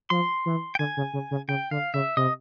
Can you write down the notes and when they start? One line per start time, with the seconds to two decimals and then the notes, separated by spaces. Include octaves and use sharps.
0.10 F3 C6
0.46 E3
0.75 G5
0.79 D3 G#5
0.97 C#3
1.14 C#3
1.31 C#3
1.48 C#3 G5
1.71 D3 F5
1.94 C#3 E5
2.17 C3 D#5